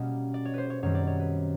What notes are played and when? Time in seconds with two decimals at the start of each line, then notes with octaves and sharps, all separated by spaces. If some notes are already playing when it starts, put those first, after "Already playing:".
Already playing: B2 G3 A#3 C#4
0.34 D5
0.45 C#5
0.54 B4 C5
0.70 C#5
0.83 F#2 D#3 G3 C4 C#5
0.95 D5
1.07 C#5
1.20 B4